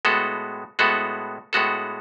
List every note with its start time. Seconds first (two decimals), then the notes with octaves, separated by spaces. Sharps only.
0.05 A2 G#3 B3 F#4 A4
0.79 A2 G#3 B3 F#4 A4
1.53 A2 G#3 B3 F#4 A4